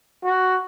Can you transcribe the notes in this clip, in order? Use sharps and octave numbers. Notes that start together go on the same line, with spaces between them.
F#4